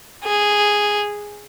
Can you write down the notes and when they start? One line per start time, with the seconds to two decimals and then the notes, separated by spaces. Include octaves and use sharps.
0.24 G#4